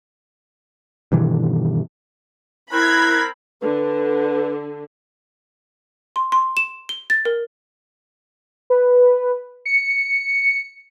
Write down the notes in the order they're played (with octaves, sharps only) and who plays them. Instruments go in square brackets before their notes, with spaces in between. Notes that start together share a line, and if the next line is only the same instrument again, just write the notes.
[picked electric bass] G2 B2 D#3 E3
[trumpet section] C4 A#4 [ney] E4 [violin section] B5 G#6 [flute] F#6
[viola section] D3 [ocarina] B4
[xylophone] C6
C6
E7
G7
A6
A#4
[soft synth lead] B4
C#7